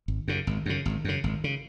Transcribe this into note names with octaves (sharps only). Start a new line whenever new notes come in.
G#1
F#2 C#3
G#1
F#2 C#3
G#1
F#2 C#3
G#1
C#3